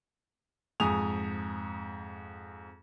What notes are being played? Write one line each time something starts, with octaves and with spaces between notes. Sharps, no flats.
F2 G#2 G#5 D#6 F7